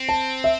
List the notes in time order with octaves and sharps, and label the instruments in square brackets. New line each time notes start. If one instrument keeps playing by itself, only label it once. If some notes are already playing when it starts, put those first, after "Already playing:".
Already playing: [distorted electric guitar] C4
[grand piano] A5
E5